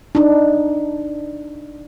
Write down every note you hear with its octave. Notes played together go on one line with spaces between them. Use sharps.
D4 D#4